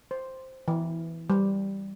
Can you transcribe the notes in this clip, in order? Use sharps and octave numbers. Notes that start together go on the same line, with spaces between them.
C5
E3
G3